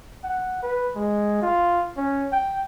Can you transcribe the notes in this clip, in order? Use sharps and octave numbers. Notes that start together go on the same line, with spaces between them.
F#5
B4
G#3
F4
C#4
G5